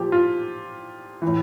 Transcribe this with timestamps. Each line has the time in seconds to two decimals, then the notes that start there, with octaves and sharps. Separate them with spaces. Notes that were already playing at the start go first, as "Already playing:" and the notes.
Already playing: A#2 F3 G4
0.12 F4
1.22 E3
1.27 A2